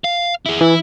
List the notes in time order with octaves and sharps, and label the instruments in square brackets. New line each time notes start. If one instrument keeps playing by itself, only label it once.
[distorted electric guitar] F5
E4 G#4
[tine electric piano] E3 [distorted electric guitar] E4